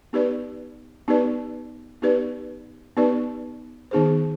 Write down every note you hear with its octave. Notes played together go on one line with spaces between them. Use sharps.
B3 D#4 G4 B4 D5
B3 D#4 G4 B4 D5
B3 D#4 G4 B4 D5
B3 D#4 G4 B4 D5
D#3 B3 D#4 G#4 C5